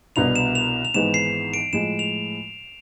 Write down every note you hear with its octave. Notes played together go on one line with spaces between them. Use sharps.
C2 B2 B3 D4 F7
E7
F7
F7
G#1 G#2 E3 G#3 B3 E7
C7
D7
A2 F3 G#3 E7
F7